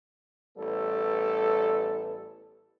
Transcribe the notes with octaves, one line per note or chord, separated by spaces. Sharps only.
A1 G3 B3 A4